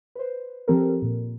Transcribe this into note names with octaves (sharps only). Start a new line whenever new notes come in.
B4 C5
F3 C4 G4 A4 A#4
A#2